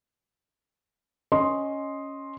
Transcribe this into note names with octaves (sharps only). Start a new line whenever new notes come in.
C#4 D#5 C6